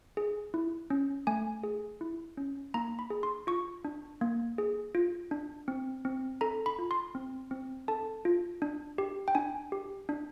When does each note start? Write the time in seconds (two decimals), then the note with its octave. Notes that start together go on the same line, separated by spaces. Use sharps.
0.17 G#4
0.54 E4
0.90 C#4
1.27 A3 G#5
1.63 G#4
2.01 E4
2.37 C#4
2.74 A#3 A#5
2.99 B5
3.10 G#4
3.23 C6
3.47 F4 C#6
3.85 D4
4.21 A#3
4.58 G#4
4.95 F4
5.31 D4
5.68 C4
6.05 C4
6.41 A4 A#5
6.66 B5
6.79 F4
6.91 C6
7.15 C4
7.51 C4
7.88 A4 A5
8.25 F4
8.62 D4
8.98 G4
9.28 G5
9.35 D4 G#5
9.72 G4
10.09 D4